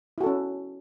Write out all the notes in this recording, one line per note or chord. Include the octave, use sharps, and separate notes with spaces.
C#4 E4 F#4 A4